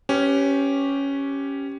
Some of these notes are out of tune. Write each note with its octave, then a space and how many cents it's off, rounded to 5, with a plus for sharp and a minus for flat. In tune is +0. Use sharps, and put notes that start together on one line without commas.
C#4 +0 G4 -5 B4 +30